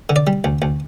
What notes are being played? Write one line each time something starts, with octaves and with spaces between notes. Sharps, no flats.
D3
D5
G3
D2
D2